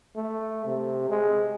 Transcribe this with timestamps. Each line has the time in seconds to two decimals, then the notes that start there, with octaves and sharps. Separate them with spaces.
0.16 A3
0.66 C3
1.10 G#3